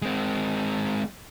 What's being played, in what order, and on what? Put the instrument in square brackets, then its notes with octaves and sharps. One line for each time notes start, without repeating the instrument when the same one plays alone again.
[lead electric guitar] G#3 C4